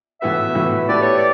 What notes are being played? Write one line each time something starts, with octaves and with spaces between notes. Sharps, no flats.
A2 E3 B3 F#4 B4 E5
A2 E3 B3 F#4 B4
A3 E4 G4 B4 D5
C#5
D5